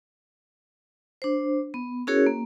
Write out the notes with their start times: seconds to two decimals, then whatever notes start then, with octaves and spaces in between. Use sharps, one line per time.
1.22 D4 C5
1.74 B3
2.07 C#4 E4 F#4 G#4 A#4 C#5
2.26 A#3